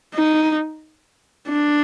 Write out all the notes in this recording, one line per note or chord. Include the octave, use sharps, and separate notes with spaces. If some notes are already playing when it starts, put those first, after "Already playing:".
D#4
D4